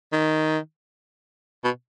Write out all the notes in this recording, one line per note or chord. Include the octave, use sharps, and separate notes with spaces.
D#3
B2